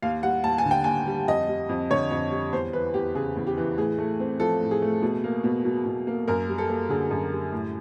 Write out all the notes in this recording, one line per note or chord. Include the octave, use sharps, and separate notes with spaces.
D#2 F5
G3 F#5
D#2 A5
G#5
D3
G5
D#2 G#5
G3
F2 D#5
G3
F2
D3 C#5
F2
G3
E2 C5
E3 B4
E2 G4
C#3 G#4
E2
G4
E3
A2 G#4
A3
C4
F3 A4
A2
G#4
A3
B2
A#3
B2
F#3
B2
A#3
F#2 A#4
G3
A4
A#3
D3 G#4
F#2
G3
A2